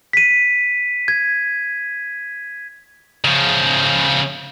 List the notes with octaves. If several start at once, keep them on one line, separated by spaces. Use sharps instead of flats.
B6 D#7
G#6
C#3 F3